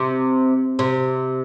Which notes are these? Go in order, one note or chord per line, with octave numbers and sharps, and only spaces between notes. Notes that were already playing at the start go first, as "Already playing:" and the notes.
Already playing: C3
C3